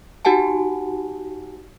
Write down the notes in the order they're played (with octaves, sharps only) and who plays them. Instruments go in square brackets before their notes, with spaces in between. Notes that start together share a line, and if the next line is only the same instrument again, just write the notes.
[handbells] D#4 F#4 G4 F#5 G#5 A5